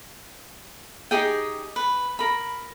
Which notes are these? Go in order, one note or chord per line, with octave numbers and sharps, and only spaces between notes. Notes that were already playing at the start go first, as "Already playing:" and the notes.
D#4 G4 G#4 G5
B4
A#4 B5